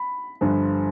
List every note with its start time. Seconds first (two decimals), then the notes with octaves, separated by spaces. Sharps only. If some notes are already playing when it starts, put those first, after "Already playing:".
Already playing: B5
0.41 G1 G2 D3 F3